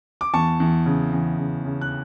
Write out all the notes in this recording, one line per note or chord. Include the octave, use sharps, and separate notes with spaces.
D6
E2 A5 C#6
E2
C#3
E2
C#3
C#3
F#6